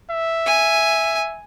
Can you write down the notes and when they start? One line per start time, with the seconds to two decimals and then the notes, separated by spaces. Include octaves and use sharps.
0.11 E5
0.46 G#5